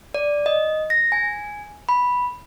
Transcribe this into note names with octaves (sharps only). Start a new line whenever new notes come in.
D5
D#5
A#6
G#5
B5